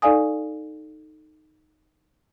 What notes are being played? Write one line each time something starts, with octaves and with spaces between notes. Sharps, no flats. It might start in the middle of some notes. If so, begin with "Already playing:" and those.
D#4 A4 D5 F5 G#5 D#6